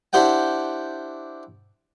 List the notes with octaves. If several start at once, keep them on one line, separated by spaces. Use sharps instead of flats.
D4 E4 G4 C5 F#5 G5